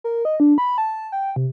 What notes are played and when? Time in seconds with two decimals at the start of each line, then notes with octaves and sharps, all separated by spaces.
0.04 A#4
0.25 D#5
0.40 D4
0.58 B5
0.78 A5
1.12 G5
1.36 C3